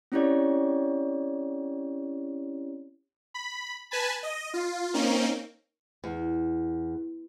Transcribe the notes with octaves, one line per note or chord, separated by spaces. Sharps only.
C4 C#4 E4 G4 C#5 D5
B5
B4 G#5 A5 B5
D#5
F4
A#3 C4 C#4 D#4
E2